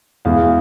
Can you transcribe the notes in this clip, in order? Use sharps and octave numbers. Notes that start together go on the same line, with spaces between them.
E2 B2 G#3 F5